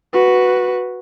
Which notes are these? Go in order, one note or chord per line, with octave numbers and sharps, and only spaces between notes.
F#4 B4